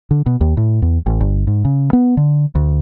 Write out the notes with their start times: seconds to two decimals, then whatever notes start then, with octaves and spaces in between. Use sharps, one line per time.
0.11 D3
0.26 B2
0.41 D#2
0.57 A2
0.82 E2
1.06 A1
1.21 G1
1.47 G#2
1.65 C#3
1.93 B3
2.17 D3
2.55 D2